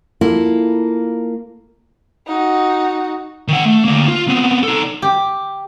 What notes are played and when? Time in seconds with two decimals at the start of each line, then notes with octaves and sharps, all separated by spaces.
0.21 A#3 E4 F4 A4
2.27 D#4 F#4
3.48 D#3 F#5
3.65 A3
3.85 D3 A#3
4.08 F4
4.28 B3 C4
4.63 D#4 A4
5.02 G4